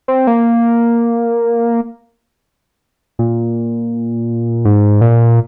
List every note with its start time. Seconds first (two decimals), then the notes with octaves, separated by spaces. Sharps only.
0.08 C4
0.27 A#3
3.19 A#2
4.65 G#2
5.01 A#2